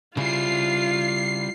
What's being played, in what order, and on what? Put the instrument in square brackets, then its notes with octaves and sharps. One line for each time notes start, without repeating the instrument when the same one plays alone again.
[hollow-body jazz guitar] C#3 [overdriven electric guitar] G3 E4 [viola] F4 [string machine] C7